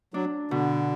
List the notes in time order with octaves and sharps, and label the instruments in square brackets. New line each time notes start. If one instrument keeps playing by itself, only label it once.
[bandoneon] F#3 [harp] D4
[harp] B2 [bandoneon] D3